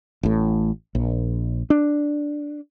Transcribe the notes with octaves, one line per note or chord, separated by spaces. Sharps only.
A1 A2
A#1
D4